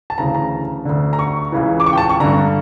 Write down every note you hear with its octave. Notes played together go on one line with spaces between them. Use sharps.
A5
D2 C#3 E3 A#5
A#5
D2 D3
A#5
C#6
C#2 C#3 E3
D6
C#6
G5
A5
C#6
G2 D3 A#5